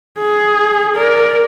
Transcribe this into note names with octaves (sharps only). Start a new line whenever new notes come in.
G#4
A#4 D5